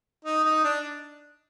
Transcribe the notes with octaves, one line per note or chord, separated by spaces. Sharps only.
D#4
D#4
D4